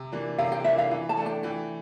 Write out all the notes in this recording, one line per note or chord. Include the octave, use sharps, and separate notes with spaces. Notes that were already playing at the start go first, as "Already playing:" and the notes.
Already playing: C3
E3 A#3 D4
C3 F5
G5
E3 A#3 D4 E5
F5
E3
A5
A3 D4
G5
E3 G5